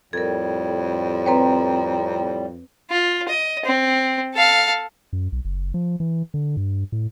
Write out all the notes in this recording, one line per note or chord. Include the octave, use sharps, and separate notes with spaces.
F2 A2 G3 A4 A#4 G#6
C4 B4 C#5 G5 A#5
F4
D#5
C4
A4 F5
F#2
B1
F#1
F3
E3
D3
G2
A2